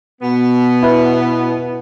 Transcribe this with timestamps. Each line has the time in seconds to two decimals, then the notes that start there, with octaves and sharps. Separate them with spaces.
0.22 B2 B3
0.83 E4 B4